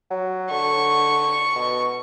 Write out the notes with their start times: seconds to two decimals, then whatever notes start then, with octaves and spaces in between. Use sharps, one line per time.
0.11 F#3
0.51 D3 C#6
1.56 B2